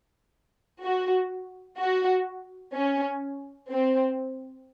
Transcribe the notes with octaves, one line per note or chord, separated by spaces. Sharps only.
F#4
F#4
C#4
C4